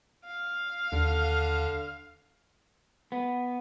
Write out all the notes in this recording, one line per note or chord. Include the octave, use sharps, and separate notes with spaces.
F5
D#2 D3
B3